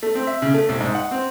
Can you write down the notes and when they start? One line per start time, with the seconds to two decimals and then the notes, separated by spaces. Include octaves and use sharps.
0.03 A3
0.15 C4
0.27 E5
0.42 C#3
0.54 A3
0.69 C2
0.81 G#2
0.95 F#5
1.11 C4